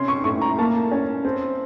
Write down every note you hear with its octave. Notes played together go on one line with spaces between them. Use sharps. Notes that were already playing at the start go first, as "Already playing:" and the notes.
Already playing: C3 C#4 C6
C#6
A2 C#6
A#5
A#3 A5
C#4
C4